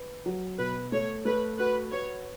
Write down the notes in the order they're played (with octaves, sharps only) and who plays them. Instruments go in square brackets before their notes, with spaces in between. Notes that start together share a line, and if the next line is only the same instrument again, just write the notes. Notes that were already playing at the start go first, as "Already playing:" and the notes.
Already playing: [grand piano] B4
F#3
[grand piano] B2 [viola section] B4
[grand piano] A3 [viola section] C#5
[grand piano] A3 [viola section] B4
[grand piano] F#4 [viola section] B4
[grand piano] B4 [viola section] C#5